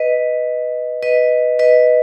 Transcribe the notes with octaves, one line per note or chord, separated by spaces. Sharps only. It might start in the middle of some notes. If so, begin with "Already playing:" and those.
Already playing: B4 D#5
B4 D#5
B4 D#5